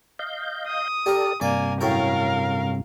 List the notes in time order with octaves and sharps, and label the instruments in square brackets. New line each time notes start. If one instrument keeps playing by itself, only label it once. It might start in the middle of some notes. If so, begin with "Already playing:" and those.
[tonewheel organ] D#5 F5 G6
[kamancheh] D#6
[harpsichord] G4 A#4 [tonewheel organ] A4 D5
[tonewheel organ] G2 C3 [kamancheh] A#3 G#5 [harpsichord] D5
[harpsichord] F#2 A2 G5 [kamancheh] A#4 F5